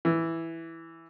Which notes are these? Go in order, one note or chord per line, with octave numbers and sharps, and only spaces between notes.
E3